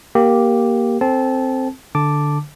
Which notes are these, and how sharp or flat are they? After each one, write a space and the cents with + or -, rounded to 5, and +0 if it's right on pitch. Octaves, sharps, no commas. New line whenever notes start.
A#3 +10 G4 +0
C4 +0 A4 +0 A5 -25
D3 +0 A5 +0 D6 +0